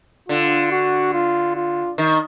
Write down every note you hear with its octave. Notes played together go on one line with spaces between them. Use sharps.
D3 F4
F#4
F4
F4
D#3